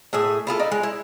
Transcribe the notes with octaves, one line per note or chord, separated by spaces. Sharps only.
A2 G#4 E5
E4 F4 G#4 A4
D#4 D5 E5
G#3
E4